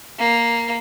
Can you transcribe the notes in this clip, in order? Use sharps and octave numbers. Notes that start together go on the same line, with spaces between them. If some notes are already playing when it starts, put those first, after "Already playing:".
A#3